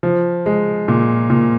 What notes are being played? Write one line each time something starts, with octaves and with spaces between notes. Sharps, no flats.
F3
G#3
A#2
A#2